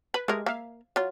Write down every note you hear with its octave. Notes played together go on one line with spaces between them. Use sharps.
B4 B5
G#3 A3 G4 G#4 A#4
A#3 E5 F5
F#3 F4